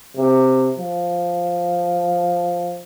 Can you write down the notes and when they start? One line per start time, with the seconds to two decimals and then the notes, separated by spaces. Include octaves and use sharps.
0.17 C3
0.78 F3